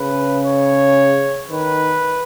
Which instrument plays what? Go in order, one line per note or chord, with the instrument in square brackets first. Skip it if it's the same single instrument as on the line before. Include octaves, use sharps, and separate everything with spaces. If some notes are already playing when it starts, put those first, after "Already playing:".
Already playing: [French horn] C#3 [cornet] B4
[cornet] C#5
[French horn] D#3 [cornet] B4